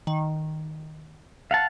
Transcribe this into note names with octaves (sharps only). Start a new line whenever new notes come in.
D#3
F5 F#5 A5